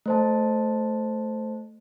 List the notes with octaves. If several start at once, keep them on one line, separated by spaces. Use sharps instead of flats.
A3 C5 A5